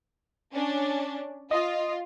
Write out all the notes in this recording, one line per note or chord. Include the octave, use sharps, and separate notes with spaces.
C#4 D4
F4 D#5